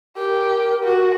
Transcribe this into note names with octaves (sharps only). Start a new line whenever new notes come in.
G4 A#4
F#4